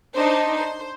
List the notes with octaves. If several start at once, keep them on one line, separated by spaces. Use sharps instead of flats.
D4 D#4 C5
C5